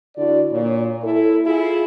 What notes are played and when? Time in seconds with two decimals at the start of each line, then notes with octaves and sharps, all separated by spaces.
0.16 D3 D4 E4 F#4 D5
0.52 A#2 C#5
1.03 E4 A4
1.46 E4 F4 G#4